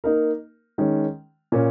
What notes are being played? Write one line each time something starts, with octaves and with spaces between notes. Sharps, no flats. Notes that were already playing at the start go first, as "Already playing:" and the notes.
A#3 D#4 A#4
D#3 G#3 C#4
A#2 A#3 C#4